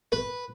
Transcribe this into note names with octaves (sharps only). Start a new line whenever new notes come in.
B4